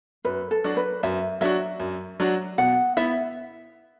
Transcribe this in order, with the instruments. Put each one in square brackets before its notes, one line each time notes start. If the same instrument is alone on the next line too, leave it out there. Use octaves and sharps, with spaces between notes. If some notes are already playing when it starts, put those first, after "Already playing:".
[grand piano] F#2 [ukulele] B4
[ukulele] A4
[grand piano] F#3 D4 F#4
[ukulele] B4
[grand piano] F#2 [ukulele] E5
[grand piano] F#3 D4 F#4 [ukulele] E5
[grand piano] F#2
F#3 D4 F#4
[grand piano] B2 [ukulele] F#5
[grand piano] B3 E4 [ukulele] E5